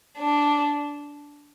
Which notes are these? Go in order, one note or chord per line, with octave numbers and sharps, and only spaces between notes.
D4